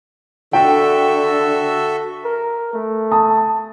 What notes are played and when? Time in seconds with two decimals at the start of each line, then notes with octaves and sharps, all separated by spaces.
0.53 D3 F#4 A4 E5 G5
2.25 A#4
2.73 A3
3.11 A5 D#6